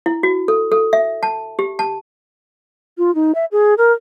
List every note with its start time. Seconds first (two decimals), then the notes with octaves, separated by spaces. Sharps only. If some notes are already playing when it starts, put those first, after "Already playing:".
0.06 E4
0.23 F#4
0.48 A4
0.72 A4
0.93 E5
1.23 A5
1.59 G4
1.79 A5
2.98 F4
3.15 D#4
3.35 E5
3.52 G#4
3.78 A#4